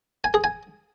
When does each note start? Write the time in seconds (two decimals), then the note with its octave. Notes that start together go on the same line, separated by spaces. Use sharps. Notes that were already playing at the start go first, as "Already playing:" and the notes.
0.24 G#5
0.34 G#4
0.44 G#5